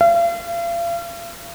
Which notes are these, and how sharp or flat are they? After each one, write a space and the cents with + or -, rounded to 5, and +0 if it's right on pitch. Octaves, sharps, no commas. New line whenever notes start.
F5 -40